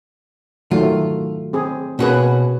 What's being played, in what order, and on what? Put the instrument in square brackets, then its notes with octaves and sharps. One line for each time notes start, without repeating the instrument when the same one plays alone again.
[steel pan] D#3 F#3 A3 [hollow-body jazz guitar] F4
[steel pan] C4 G#4
[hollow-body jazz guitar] B2 F#4 G#4 [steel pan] A#3 C#4 B4